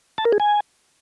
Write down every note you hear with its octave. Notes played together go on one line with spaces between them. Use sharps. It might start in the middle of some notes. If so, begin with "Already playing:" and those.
A5
A#4
G#4
G#5